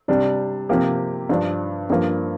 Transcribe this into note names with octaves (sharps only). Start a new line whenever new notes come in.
C3 G3 D4
C3 F3 A#3 G4
G2 F3 D4
G2 F3 A#3